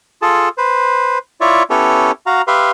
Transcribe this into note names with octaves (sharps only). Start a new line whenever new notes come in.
F4 G#4 A4 A5
B4 C5
E4 F4 C#5 D5 E5
B3 C#4 E4 G4 A4 C#5
F#4 F5 A#5
G4 B4 E5 F5 C6